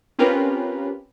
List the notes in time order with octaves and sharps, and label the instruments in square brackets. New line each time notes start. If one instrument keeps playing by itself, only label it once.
[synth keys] C4 C#4 F4 G4 A#4 B4